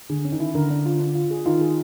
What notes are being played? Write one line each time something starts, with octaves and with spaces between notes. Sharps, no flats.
D3 G#4
C#4
D#3
E4
D3 A#4
D4
F4
D4
F4
G#4
D#3 F4
G#4